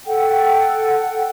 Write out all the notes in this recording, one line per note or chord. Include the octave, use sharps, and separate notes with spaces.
A4 F#5 G5